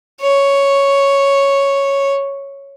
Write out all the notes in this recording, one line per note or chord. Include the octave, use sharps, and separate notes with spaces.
C#5